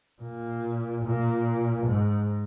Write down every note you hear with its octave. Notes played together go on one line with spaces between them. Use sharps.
A#2
A#2
G#2